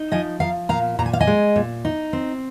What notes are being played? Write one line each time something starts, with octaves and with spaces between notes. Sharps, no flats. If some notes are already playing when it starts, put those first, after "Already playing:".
Already playing: D#4
F3 D#5 G#5
F3 F5 A#5
A#2 F5 A#5
A#2 A#5
G#5
F5
D#5 G#5
G#3
A#2
D#4
C4